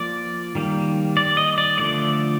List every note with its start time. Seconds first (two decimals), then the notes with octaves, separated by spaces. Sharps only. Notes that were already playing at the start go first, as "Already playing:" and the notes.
Already playing: F3 A#3 D5
0.55 D#3 G3 A#3
1.17 D5
1.37 D#5
1.58 D5
1.78 D3 F3 A3 D5